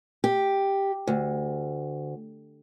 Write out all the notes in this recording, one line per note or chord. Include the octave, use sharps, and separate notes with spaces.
G4
D2